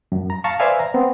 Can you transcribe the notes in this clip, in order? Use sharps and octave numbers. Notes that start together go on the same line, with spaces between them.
F#2
A#5
F5 A5 A#5 C#6
B4 C5 D5 E5 F5 G#5
A#5
B3 C4